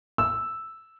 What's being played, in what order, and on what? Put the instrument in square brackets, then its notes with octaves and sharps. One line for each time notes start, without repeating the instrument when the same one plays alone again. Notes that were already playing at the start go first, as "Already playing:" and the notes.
[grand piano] E6